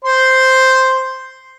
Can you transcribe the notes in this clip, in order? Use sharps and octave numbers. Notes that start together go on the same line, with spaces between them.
C5 C6